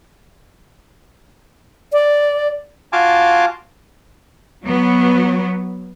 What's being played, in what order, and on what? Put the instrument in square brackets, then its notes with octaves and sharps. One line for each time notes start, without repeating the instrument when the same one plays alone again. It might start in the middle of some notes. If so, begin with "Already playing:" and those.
[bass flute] D5
[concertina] F4 F#4 F5 G#5 A5 D6
[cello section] F#3 B3